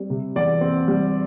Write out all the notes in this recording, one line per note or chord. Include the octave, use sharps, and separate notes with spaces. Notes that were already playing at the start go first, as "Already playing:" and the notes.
Already playing: G3 C4
C3
E2 D5
C4
G3